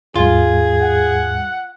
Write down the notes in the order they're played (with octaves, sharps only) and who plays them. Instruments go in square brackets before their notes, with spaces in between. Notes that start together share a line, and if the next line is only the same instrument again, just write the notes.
[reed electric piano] D#2 G#2 G3 [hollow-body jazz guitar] F4 [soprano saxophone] G#4
[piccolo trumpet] F#5